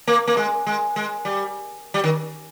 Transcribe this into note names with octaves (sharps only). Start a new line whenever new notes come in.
A#3
A#3
G#3
G#3
G#3
G3
G3
D#3